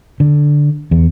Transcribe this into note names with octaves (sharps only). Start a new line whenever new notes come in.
D3
E2